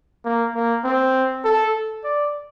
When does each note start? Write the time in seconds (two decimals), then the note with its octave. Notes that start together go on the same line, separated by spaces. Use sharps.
0.25 A#3
0.55 A#3
0.84 C4
1.45 A4
2.04 D5